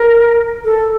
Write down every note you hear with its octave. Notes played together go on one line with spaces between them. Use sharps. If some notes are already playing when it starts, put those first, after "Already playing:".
Already playing: A#4
A4